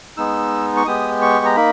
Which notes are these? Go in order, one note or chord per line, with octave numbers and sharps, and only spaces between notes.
G#3 B3 D#4 E6
C#6
G#3 B3 G4 D#6
C#6
A#5
A#3 D#4 B5